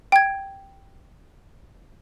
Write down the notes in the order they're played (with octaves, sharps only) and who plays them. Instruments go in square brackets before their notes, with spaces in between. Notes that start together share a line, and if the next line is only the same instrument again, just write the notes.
[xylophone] G5 G#6